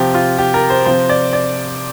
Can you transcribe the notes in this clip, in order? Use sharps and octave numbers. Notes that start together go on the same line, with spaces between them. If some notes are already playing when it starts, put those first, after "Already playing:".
Already playing: C3 F3 G4
F4
G4
A#4
C5
C3 F3 C5
D5
D5